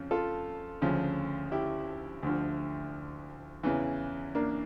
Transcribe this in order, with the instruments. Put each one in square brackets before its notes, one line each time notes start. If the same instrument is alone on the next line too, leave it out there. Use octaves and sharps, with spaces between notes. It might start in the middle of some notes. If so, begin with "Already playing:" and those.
Already playing: [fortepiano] F2 C#3 F3
F4 A4
D2 C#3 F3
E4 G4
D2 D3 F3
E2 C#3 E3
A#3 D4